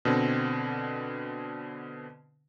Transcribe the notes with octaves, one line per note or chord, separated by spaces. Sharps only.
B2 D3 C4